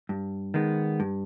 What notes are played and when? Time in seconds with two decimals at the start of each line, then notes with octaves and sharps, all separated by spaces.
0.09 G2
0.54 D#3 G#3 B3
1.00 G2